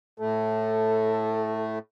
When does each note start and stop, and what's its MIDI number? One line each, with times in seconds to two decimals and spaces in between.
0.20 1.79 45
0.20 1.79 57
0.20 1.82 69